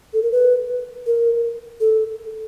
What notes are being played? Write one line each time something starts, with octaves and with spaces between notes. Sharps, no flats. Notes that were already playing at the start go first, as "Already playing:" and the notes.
A4
A#4
B4
A#4
A4